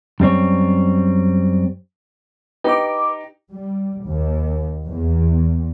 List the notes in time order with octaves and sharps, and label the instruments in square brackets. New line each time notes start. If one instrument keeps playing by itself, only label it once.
[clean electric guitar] F#2 G3 C4 C#5
[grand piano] D#4 G4 [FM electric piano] B4 D6
[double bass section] G3
D#2
E2